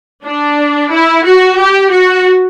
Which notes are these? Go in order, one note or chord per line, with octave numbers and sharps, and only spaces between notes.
D4
E4
F#4
G4
F#4